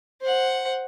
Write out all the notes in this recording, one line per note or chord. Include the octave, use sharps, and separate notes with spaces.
C5 F#5